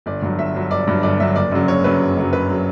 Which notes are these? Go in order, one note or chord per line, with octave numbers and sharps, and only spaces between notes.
G1 D5
G2 F#3
G1 E5
G2 F#3
G1 D5
G2 F#3
G1 D5
G2 F#3 E5
F#1 D5
F#2 C#3 F#3
F#1 C#5
F#2 C#3 F#3 B4
F#1
F#2 C#3 F#3
F#1 B4
C#3 F#3